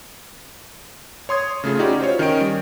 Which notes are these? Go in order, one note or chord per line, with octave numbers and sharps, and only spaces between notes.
C#5 C6 D#6 G#6
C#3 A3 F4 G#4
C#4 D#4 E4 F#4 G4 D5
F4 C5 C#5
D#3 C#4 C#5 D#5 G5 D7
G3